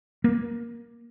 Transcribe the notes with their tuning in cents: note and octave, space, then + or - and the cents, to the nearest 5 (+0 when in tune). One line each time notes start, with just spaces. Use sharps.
A#3 +15